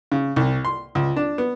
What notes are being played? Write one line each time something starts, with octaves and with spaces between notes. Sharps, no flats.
C#3
C2
C6
C#2
D4
B3